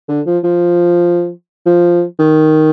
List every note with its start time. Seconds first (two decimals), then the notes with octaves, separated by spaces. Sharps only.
0.08 D3
0.26 F3
0.44 F3
1.66 F3
2.19 D#3